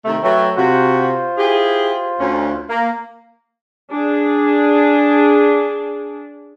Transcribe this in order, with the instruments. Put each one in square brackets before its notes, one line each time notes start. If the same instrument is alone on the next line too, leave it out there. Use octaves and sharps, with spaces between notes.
[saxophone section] C3 D#3 A3
[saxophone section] F#3 A3 [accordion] B4 C#5 G5
[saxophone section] C3 F#4 [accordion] F4 C5
[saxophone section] E4 G4 G#4
D2 C#4
A#3
[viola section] D4 G#4